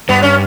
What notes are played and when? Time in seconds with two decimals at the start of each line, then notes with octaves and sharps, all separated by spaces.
0.09 G2 B3
0.23 C#4